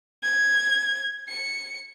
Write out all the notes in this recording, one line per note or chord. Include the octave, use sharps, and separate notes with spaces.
G#6
C#7